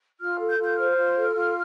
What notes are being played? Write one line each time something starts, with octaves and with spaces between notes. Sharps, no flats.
F4 F6
A4
G6
F4 G6
C5 F6
F4
A4
F4